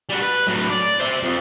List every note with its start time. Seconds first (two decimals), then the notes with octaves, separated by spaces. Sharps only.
0.10 G3 F#4
0.21 B4
0.47 A2 F#3
0.70 D5
1.00 C5 E5
1.23 F2